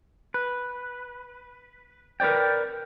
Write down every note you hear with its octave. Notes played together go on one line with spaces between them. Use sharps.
B4
A#4 B4 C#5 D5 G5